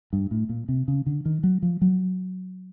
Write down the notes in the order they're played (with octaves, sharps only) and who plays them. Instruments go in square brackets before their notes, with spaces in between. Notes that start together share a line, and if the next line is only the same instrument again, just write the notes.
[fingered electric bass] G2
A2
A#2
C3
C#3
D3
D#3
F#3
F3
F#3